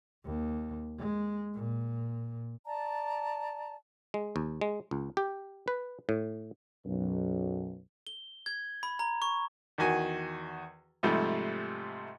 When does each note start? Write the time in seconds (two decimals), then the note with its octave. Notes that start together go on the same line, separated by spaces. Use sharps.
0.24 D#2
0.98 G#3
1.54 A#2
2.64 D5 A5 A#5
4.14 G#3
4.36 D#2
4.61 G#3
4.91 C#2
5.17 G4
5.68 B4
6.09 A2
6.86 B1 F#2
8.07 G7
8.46 G#6
8.83 B5
8.99 A#5
9.22 C#6
9.78 E2 D#3 F#4 G#5
11.03 G#2 C3 F3 G3 A3